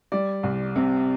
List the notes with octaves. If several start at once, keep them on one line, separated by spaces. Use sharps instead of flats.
G3 D5
C2
C3